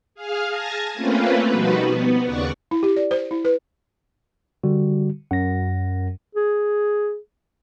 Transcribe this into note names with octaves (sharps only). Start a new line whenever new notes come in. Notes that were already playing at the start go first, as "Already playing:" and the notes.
G#4 F5 F6
G#5 A5 G#6 A#6
A3 A#3 C4 C#4 F4 B4
B2 F3 G3 D#4 F#4 B4
B3
D#2 C#3 D5 F#5 C#6
E4
G4
D5
C5
E4
B4
D3 G3 F#4
F#2 F#5 A#6
G#4